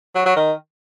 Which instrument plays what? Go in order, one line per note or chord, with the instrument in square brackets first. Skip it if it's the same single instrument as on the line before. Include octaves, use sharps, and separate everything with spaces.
[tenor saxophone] F#3
F#3
D#3